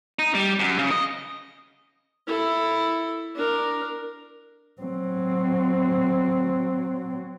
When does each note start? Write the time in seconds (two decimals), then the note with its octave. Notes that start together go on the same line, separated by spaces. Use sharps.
0.19 D#4
0.35 G3
0.60 F#2
0.79 C#3
0.91 D#5
2.27 E4 A4
3.35 D4 A#4
4.82 F#3 C4